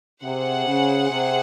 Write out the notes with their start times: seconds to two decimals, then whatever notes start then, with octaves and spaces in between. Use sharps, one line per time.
0.23 C3 G#4 C5 F#5
0.67 C#3
1.10 C3